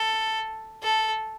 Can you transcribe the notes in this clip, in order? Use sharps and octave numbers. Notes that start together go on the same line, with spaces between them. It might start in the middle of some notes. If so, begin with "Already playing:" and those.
Already playing: A4
A4